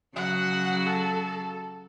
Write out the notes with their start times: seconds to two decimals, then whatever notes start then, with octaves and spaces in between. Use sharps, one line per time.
0.16 C#3 F#3 F#4 F#5
0.86 A4